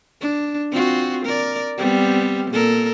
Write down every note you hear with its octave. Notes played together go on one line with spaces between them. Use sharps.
D4
C4 F4 F#4
A#4 D5
G3 B3 C4
A#2 A4 A#4